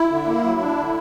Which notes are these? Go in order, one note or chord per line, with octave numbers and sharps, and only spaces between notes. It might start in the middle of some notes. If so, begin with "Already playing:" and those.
Already playing: E4
D3
A#3
F#3
D4
D3